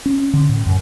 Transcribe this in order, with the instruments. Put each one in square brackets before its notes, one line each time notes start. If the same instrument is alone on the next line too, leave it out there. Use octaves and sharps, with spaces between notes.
[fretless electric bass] C#4
D3
A2
F#2